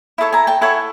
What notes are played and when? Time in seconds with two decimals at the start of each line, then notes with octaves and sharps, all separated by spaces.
0.18 E4 A4 C#5
0.32 G#5 A#5
0.47 G5 A5
0.61 E4 A4 C#5 F#5 G#5